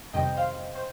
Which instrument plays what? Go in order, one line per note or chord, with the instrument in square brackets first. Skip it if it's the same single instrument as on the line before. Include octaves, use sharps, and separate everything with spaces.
[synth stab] F2 C3 D#3 G3 D#5 G5
C5 F5
C5